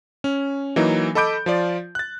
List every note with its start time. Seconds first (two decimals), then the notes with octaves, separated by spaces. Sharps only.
0.24 C#4
0.76 E3 F#3 A#3 D#4
1.15 A4 D#5 B5 D6 G6 D7
1.46 F3 F4 D5
1.95 F#6 A6